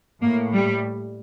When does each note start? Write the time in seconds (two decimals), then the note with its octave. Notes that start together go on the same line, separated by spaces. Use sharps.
0.22 A2 A#3
0.52 G3